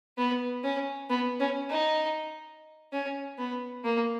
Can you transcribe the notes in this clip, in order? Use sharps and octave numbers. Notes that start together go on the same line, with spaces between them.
B3
C#4
B3
C#4
D#4
C#4
B3
A#3